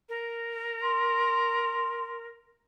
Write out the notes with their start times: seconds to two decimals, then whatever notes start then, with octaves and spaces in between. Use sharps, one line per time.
0.09 A#4
0.83 C6